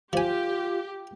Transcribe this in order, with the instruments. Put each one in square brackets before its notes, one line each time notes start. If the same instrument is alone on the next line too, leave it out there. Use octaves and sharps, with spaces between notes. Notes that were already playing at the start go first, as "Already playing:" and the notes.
[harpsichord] F3 G#5 [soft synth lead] F4 [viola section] G4